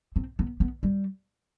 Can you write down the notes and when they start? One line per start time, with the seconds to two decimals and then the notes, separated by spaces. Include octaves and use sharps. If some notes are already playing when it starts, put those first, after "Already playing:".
0.16 C4
0.39 B3
0.60 B3
0.83 G3